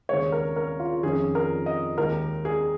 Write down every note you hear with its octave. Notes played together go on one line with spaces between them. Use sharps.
D#2 C#3 G#3 C#5
A#4
A#4
F4
F2 D#3 C#4 G#4
A#4
D#5
D#2 D#3 G#3 A#4
G#4